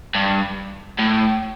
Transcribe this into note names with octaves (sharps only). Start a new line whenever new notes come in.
G2
A2